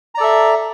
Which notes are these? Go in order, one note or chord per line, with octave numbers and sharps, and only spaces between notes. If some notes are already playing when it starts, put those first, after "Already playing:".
A4 D5 E5 A#5